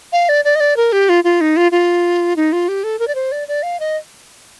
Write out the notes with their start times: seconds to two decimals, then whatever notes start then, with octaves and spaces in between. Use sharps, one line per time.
0.12 F5
0.29 D5
0.45 D5
0.55 D#5
0.60 D5
0.77 A#4
0.92 G4
1.09 F4
1.24 F4
1.41 D#4
1.57 F4
1.72 F4
2.36 D#4
2.52 F4
2.68 G4
2.84 A4
2.99 A#4
3.08 D5
3.15 C5
3.32 D5
3.48 D5
3.63 F5
3.80 D#5